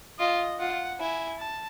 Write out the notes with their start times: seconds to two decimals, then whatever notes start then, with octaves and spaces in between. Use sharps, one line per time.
0.19 F4 D#5
0.60 F4 F#5
1.00 E4 G#5
1.39 A5